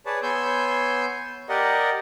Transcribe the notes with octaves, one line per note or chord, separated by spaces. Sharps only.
G#4 B4 C#5 D5 A5
B3 C#5 G#5 C6 E6 G6
G4 A#4 D5 D#5 F#5